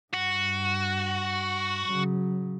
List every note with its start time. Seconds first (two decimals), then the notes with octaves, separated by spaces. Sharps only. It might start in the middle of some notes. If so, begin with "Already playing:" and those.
0.14 G2 F#4
1.86 C#3 F#3